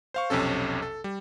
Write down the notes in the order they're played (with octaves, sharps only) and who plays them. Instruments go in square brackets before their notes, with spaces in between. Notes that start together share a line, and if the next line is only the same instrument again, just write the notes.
[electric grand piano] C5 F5 C#6
B1 F2 C3 C#4 A4
A4
G3